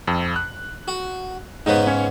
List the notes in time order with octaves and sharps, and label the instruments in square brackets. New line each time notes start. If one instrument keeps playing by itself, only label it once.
[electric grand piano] F2
F#6
[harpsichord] F#4
[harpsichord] G#2 C#3 B3 [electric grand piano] D#4 B4
[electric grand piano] C#4 C#5